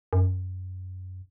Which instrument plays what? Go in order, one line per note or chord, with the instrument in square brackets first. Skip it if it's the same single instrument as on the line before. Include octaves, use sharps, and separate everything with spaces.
[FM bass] F#2